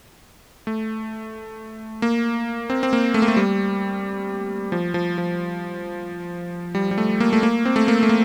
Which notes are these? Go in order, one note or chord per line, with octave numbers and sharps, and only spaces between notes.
A3
A#3
C4
C4
A#3
A3
A#3
A3
G3
F3
F3
F3
G3
G3
A3
A#3
A3
A#3
C4
A3
A#3
A3
A#3